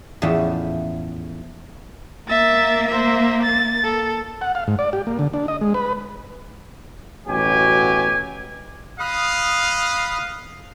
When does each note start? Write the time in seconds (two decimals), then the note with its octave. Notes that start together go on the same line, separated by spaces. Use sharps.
0.22 E2 A2 F3 C#4 A4 E5
2.28 A#3 E5 A6
2.88 C5 E5
3.43 A6
3.84 A4
4.41 F#5
4.55 F5
4.67 G#2
4.79 D5
4.93 G4
5.07 A#3
5.19 D3
5.33 D4
5.48 D#5
5.61 G#3
5.74 B4
7.28 A1 B2 F#3 G4 G#5
9.00 D#5 F5 B5 D#6 F#6